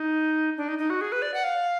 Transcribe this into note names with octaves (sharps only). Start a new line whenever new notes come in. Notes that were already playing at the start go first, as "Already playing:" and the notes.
Already playing: D#4
D4
D#4
D#4
F#4
G#4
B4
D5
F#5
F5